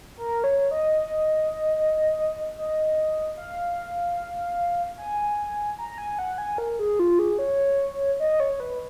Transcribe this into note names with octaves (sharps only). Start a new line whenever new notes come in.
A#4
C#5
D#5
D#5
F5
G#5
A#5
A#5
G#5
F#5
G#5
A#4
G#4
F4
G#4
C#5
D#5
C#5
B4